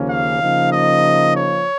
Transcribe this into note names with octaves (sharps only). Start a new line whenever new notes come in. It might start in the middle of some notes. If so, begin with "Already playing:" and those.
Already playing: D#2 C#3 F3 A#3 C#4
F5
C#3 F3 A#3 D#4
D#5
C#5